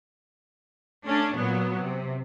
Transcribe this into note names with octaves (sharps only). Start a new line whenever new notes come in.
A3 C#4 D4
A#2 F#3 B3
C3